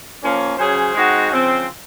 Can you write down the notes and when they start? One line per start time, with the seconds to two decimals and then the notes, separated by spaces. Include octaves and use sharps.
0.22 F3 A#3 C#4
0.58 C#3 F#3 C#4 G#4 C5
0.94 G#3 C4 D#4 F#4
1.30 C#3 F3 C4